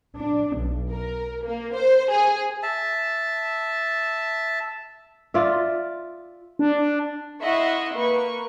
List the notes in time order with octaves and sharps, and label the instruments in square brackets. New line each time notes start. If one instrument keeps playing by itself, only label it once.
[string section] D4
B1
A#4
A#3
C5
G#4
[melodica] E5 A5
[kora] F4 D5 E5
[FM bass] D4
[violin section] E4 D#5 E5 F#5 C6 C#6
A#3 B4 C#6